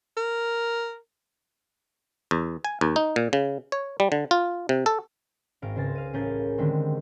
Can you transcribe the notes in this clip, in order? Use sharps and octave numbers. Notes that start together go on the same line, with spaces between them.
A#4
E2
G#5
D#2
D#4
A#2
C#3
C#5
G3
D3
F4
C3
A4
G#1 F5 A#6 D7
C#2 C5 G#5 A6 A#6
F5 D#7
A1 C#4 G#4 A#4 G6 A6
D3 D#3 G3 G#3 C4